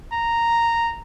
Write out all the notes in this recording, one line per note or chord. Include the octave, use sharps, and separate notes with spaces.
A#5